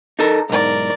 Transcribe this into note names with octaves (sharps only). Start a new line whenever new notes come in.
D#4 A4 A#4
B1 G#2 A#4 D5